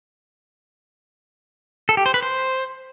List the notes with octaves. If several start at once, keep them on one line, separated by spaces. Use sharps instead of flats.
A4
G4
C5
B4
C5